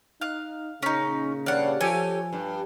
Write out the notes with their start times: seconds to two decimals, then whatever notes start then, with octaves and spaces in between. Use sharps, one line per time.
0.21 D#4 F5 F#6
0.83 A#2 C#3 C#4 D#4
1.46 G2 C#5 D5 F5 F#5
1.81 F3 G4 A4 C#5 G#5
2.33 G2